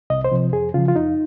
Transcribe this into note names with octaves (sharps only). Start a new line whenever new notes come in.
C2 D#5
C5
C3 F3
F2 G#4
C#3 F3 F4
F4
F2 D#4